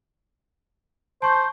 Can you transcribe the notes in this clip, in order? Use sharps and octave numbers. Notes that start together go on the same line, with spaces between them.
C5 A5 C#6 G6